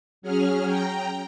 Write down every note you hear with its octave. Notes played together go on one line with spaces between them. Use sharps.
F#3 C#4 G#4 F6
G5 A#5